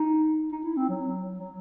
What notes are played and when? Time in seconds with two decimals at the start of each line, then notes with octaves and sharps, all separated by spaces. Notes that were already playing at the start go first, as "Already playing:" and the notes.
Already playing: D#4
0.52 D#4
0.65 E4
0.77 C4
0.89 F#3
1.38 F#3